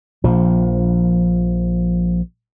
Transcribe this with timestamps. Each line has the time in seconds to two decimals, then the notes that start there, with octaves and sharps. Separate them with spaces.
0.24 A#1 F3